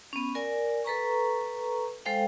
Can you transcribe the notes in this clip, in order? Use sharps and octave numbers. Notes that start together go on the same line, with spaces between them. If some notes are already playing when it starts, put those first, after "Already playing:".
B3 C#4
A#4 D5 G#5
A4 B4 A#5 C#6
G#3 A4 C5 F5 G5